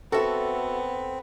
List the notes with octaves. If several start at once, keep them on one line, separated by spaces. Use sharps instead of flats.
B3 C4 F#4 A4 E5